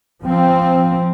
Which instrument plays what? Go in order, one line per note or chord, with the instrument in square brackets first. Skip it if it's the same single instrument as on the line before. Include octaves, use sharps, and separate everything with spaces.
[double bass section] F3 C4